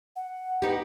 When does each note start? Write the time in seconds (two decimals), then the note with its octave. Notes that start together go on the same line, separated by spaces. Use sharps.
0.16 F#5
0.62 B3 D#4 G4